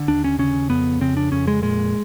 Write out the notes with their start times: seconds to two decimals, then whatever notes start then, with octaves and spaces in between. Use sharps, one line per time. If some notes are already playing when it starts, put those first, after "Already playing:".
Already playing: D3
0.08 D#2 D4
0.24 C#4
0.39 C#3 C#4
0.70 F2 B3
1.01 C#3 C4
1.17 D4
1.32 F2 C#4
1.47 G#3
1.62 A#2 G#3